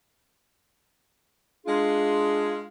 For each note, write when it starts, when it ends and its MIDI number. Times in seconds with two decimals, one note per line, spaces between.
1.66 2.66 56
1.66 2.68 62
1.66 2.66 65
1.66 2.68 68